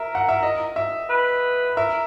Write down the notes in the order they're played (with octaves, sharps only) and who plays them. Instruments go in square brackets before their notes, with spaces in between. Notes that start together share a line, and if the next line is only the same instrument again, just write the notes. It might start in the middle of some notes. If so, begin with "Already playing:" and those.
Already playing: [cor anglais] A#4 [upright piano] E5
[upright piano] F#5
E5
D#5
E5
[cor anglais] B4
[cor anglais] A#4 [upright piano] E5